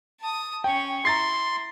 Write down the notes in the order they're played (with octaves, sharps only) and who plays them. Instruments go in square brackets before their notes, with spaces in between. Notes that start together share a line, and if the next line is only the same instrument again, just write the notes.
[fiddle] A5 D#6
[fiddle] C#4 C#6 [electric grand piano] G5
[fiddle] E4 [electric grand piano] A#5 A6 C7 [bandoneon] C6